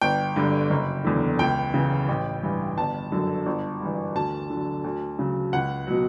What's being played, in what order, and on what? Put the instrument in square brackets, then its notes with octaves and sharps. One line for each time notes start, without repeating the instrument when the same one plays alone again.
[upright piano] G1 G5
G2 D3
F#1
E2 D3
C#2 G5
C#3 E3
A1
G2 E3
G1 A5
F#2 D3 F#3
G1
G2 E3
D2 A5
D3 F#3
D2
C#3 F#3
C#2 F#5
B2 F#3